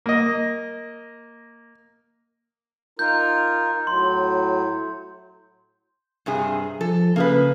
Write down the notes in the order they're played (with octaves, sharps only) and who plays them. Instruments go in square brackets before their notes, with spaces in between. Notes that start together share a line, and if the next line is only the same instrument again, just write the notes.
[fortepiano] A#3 D#5
[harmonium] D#4 F4 A#4 [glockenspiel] G6
[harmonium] A2 F#3 [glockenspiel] C6
[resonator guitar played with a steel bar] G2 C3 G#4
[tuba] F3 [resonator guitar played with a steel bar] A4
[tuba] C#3 [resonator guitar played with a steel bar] A#3 G#4 B4